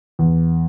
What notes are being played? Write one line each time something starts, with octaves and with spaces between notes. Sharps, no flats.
E2